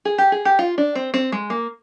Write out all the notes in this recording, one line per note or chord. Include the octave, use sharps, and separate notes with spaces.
G#4
G4
G#4
G4
F4
D4
C4
C4
G#3
A#3